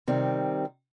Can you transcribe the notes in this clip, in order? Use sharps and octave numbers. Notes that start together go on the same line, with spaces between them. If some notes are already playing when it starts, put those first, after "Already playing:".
C3 D#3 G3 C4